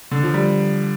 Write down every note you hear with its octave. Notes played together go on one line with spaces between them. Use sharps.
D3
F3
G3